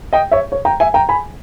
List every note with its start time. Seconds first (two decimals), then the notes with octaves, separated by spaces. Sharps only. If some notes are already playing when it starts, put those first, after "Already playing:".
0.13 D#5 G5
0.31 C#5 E5
0.52 C#5
0.65 G5 A#5
0.80 E5 G#5
0.94 G5 A#5
1.09 G#5 B5